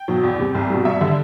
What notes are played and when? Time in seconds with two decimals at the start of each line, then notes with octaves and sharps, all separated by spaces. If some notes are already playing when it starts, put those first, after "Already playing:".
Already playing: G5
0.08 B2 F#3
0.23 E2
0.39 C3 G3
0.54 C2
0.70 B2 G3
0.85 G2 E5
1.01 D3 G3 E5